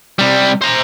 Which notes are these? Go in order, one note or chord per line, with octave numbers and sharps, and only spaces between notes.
C3 G3
C5 A#5